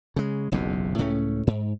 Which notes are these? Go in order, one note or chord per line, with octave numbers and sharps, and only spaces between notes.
C#3 G#3
F#1 B1 E2 C3
C#2 A2 A3 C#4
G#2